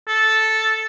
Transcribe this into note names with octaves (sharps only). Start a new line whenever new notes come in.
A4